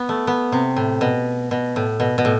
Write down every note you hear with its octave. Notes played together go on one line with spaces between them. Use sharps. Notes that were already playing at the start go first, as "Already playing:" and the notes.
Already playing: B3
A3
B3
C3
A2
B2
B2
A2
B2
B2
A2